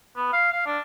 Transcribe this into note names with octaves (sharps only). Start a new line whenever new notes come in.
B3
F5
F5
D4